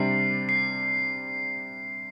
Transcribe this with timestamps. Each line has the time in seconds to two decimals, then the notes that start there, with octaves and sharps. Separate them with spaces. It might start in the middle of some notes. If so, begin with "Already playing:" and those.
Already playing: C3 G3 D4 C7
0.49 C7